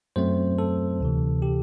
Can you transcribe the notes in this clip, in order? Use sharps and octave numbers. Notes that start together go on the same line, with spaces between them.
F#2 F#3 A3 C4 C5
A4
D2 C3 E3
G4